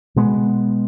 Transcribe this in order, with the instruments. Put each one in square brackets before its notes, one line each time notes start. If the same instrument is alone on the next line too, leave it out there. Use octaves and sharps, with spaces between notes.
[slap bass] B2 G#3 B3